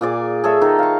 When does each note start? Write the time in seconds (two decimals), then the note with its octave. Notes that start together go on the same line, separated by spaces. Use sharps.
0.01 A#2 G#4 D5 G#5
0.44 G#4 A4 C#5 E5
0.61 D#3 D#4 A4
0.79 F5 C#6